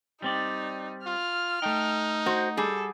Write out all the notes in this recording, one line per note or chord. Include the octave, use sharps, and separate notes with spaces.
G3 C4 D#4 D5
F4 F6
A3 D#4 G5
F#4 C5
G3 G#4 A4